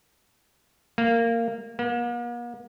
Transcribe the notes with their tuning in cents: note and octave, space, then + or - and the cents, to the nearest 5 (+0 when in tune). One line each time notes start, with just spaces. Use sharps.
A#3 -15
A#3 +45